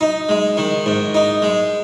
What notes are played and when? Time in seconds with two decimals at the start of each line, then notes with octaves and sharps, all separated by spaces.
0.01 D#4
0.29 G#3
0.57 D#3
0.86 G#2
1.15 D#4
1.42 G#3